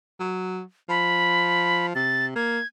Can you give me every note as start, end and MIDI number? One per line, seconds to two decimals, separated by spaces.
0.20 0.62 54
0.89 1.95 53
0.89 1.86 83
1.95 2.32 48
1.95 2.26 93
2.36 2.59 58
2.36 2.67 92